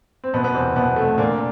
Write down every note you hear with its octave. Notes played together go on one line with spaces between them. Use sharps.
C4
F#1 B2 B3
B3
E2 C3 C4
F#1 B2 B3
C3 A3
A#2 D3 A#3